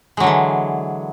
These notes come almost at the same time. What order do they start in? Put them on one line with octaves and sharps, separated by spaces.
G#3 F#3 D3 E3